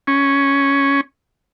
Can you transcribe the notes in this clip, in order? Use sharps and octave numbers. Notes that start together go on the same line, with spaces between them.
C#4